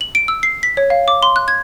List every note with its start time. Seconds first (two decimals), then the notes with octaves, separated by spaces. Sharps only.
0.01 F#7
0.15 D7
0.28 E6
0.43 C7
0.63 B6
0.77 C#5
0.90 F5
1.08 D6
1.23 C6
1.36 F#6
1.48 G#6